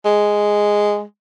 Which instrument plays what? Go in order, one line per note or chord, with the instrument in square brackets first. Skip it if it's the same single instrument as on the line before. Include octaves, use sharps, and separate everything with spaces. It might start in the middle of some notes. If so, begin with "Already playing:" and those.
[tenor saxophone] G#3